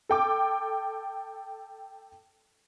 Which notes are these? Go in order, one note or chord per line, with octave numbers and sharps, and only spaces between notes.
A4 G5 D6